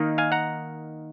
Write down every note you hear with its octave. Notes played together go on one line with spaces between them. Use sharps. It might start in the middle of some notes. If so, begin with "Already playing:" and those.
Already playing: D#3 A#3 D#4
F5 G#5
F#5 A#5